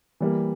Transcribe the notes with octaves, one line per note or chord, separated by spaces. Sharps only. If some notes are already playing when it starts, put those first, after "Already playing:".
E3 G3 A#3